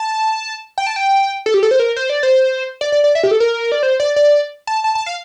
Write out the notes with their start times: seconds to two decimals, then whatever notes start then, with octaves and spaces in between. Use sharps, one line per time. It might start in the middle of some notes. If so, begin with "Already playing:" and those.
Already playing: A5
0.78 G5
0.87 A5
0.96 G5
1.46 A4
1.54 G4
1.63 A4
1.71 C5
1.80 A#4
1.96 C5
2.09 D5
2.23 C5
2.81 D5
2.92 D5
3.04 D5
3.15 E5
3.23 G4
3.31 A4
3.40 A#4
3.72 D5
3.83 C5
4.00 D5
4.16 D5
4.67 A5
4.84 A5
4.95 A5
5.06 F5